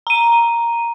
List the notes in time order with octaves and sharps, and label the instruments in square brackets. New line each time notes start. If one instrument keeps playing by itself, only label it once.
[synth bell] A#5 D#7